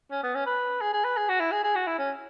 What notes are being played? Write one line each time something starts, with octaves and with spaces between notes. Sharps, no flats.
C#4
B3
C#4
B4
G#4
G#4
B4
G#4
F#4
E4
G#4
G#4
F#4
E4
C#4